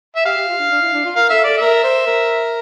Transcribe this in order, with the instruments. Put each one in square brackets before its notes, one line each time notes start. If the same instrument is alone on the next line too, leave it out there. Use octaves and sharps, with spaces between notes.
[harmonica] E5
[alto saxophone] G4 [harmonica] F5
[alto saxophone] G4
F4
D4
D4
E4
D4
F4
[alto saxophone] A#4 [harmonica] F5
[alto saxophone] A4 [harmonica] E5
[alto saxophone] A4 [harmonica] D5
[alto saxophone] A#4 [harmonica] E5
[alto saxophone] C5
A#4